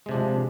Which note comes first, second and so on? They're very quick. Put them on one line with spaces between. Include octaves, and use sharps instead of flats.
G#3 C3 D4 F3